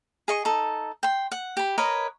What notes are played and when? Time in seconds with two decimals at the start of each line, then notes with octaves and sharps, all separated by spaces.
0.28 G#4 D#5 C#6
0.45 D#4 A4
1.03 G5 C6
1.32 F#5
1.57 G4 B5
1.78 A#4 B4 C#5 D#5